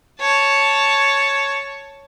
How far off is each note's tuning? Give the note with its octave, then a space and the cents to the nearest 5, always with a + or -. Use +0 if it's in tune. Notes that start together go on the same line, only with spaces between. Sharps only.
C#5 +0 A5 +0